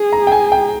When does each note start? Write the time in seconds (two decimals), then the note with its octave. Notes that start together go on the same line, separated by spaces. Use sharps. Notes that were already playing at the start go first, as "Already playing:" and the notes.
Already playing: G#4
0.12 A#5
0.27 G5
0.32 G#5
0.52 G5